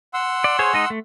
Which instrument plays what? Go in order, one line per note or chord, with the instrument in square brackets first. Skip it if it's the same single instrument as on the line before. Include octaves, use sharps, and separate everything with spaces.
[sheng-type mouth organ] F#5 C6 E6
[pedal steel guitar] D5
G#4 C5 C#5
G#3 D#4 D#5
A3